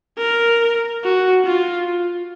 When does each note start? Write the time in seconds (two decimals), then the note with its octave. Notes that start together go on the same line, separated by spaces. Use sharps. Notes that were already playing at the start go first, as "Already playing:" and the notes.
0.18 A#4
1.04 F#4
1.46 F4